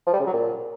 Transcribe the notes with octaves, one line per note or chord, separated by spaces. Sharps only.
F3
G3
C#3
F#3
A#2